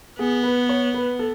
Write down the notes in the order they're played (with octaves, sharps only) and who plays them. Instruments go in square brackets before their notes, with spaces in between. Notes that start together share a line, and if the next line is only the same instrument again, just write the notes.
[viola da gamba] B3 [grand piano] G#4
[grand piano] B4
C#5
B4
A4